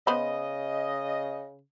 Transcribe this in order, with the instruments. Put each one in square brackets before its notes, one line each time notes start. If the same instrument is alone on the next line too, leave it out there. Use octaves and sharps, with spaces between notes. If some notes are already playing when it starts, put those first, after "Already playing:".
[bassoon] C#3 [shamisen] B3 C5 B5 [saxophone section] D#5